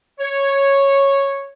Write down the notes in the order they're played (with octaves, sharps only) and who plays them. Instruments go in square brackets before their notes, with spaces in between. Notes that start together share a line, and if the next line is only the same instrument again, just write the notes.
[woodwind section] C#5